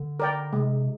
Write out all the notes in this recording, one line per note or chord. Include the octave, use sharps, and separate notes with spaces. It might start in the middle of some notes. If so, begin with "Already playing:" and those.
Already playing: D3
A#4 D5 G5
C3 G#3